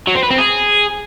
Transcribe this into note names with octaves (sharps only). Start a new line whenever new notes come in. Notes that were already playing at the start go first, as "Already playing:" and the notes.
F#3
C4
B4
C4
G#4